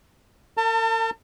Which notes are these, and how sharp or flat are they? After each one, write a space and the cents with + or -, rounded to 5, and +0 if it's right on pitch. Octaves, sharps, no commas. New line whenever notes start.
A#4 -45 A5 +35